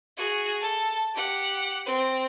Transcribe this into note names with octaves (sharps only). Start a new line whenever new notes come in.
F#4 G#4
A4 A5
G4 F#5
C4